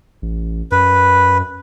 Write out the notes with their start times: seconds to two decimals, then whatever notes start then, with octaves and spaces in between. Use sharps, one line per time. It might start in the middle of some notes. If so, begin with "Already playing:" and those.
0.22 A1
0.72 F#2 B4